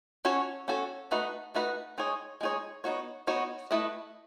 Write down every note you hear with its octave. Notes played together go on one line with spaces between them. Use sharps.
C#4 F#4 A4 C#5
C#4 F#4 A4 C#5
A3 D#4 F#4 B4
A3 D#4 F#4 B4
G#3 D#4 G#4 C#5
G#3 D#4 G#4 C#5
B3 D#4 F#4 C#5
B3 D#4 F#4 C#5
A3 E4 B4 D#5